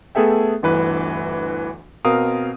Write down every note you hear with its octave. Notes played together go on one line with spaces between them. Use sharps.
A3 B3 G#4 A4 E5 G5
G1 D2 E3 B4
B2 C4 A#4 F5 D#6